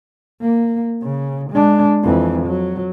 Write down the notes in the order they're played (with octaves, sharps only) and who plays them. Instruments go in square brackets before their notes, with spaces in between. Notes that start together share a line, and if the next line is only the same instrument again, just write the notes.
[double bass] A#3
C#3
G#3 D4
F2 E3
F#3